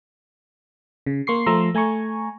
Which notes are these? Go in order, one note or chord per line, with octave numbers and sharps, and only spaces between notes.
C#3
A#3 C6 C#6 C7
F3 A3 A#5 C6 E6
A3 G#5 A#5 C#6